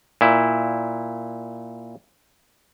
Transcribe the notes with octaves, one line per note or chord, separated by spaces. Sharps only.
A#2 E4